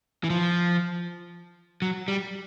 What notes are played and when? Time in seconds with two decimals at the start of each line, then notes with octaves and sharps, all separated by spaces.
0.24 E3
0.30 F3
1.82 F#3
2.08 G3